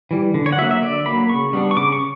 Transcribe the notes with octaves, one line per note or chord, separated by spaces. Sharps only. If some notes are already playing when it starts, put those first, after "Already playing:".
E3 G3
D3
C#5
F#5
F#3 A#3 E5
E5
D3 D5
F#3 A#3 B5
C#3 C#6
G3 B3 D4
C#6
C#3 D6
C#6